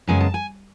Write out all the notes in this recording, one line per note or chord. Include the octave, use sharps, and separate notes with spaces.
F#2 C#3 G#3 B3 G#5
A5
G#5